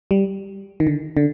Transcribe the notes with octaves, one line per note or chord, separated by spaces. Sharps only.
G3
D#3
D3
D3